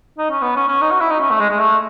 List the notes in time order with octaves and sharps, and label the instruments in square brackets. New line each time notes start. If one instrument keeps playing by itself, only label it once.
[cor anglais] D#4
C#4
B3
C#4
C#4
D#4
F#4
E4
D#4
C#4
A3
G#3
G#3
A3